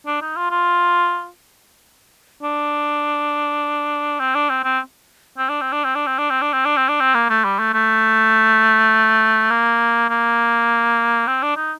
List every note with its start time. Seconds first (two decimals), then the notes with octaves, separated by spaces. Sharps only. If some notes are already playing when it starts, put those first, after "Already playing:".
0.06 D4
0.21 D#4
0.36 F4
0.51 F4
2.42 D4
4.20 C4
4.35 D4
4.49 C4
4.64 C4
5.38 C4
5.49 D4
5.61 C4
5.72 D4
5.84 C4
5.95 D4
6.07 C4
6.18 D4
6.30 C4
6.42 D4
6.53 C4
6.65 D4
6.77 C4
6.88 D4
7.00 C4
7.14 A#3
7.29 A3
7.44 G3
7.59 A3
7.74 A3
9.50 A#3
10.10 A#3
11.27 C4
11.43 D4
11.57 D#4